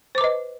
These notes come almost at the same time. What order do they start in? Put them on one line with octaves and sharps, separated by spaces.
C5 D6 B4 D#5